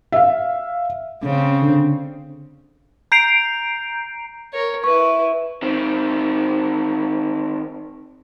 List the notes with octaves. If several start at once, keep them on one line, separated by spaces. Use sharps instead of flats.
E5 F5
C#3 C4 C#4
D3
A#5 G6 C7 D7 F7
A#4 C#5
E4 B4 C#6
D#3 C4